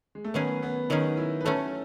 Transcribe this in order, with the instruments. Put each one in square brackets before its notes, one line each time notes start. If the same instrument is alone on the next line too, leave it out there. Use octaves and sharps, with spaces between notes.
[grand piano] G#3
A3
[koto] D#3 F#3 C#4 G#4 [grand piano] B3
[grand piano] B3
[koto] D#3 F#3 C#4 G#4 [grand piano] D#4
[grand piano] E4
B4
[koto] F#3 A3 C#4 [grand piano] A4